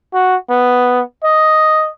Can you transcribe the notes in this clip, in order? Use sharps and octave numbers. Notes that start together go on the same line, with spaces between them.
F#4
B3
D#5